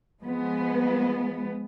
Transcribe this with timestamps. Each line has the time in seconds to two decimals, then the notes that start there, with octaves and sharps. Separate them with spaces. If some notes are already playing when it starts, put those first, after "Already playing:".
0.21 F3 G#3 B3